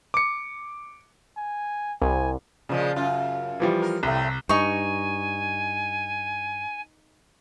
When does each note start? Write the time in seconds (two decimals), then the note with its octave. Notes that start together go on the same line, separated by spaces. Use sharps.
0.14 D6 C#7
1.37 G#5
2.02 C2 G#5
2.69 A#2 C#3 F3 G#3
2.96 F#2 F4
3.60 E3 F3 G3
3.82 A#4
4.03 C2 A2 A3
4.49 G2 D#4 G#5 C#6